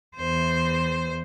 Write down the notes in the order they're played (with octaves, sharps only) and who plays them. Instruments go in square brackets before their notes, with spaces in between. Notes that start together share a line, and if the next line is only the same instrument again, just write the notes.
[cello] E2 C5